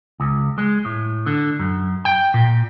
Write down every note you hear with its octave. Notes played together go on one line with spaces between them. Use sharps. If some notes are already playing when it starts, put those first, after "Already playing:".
C#2
G#3
A2
D3
F#2
G5
A#2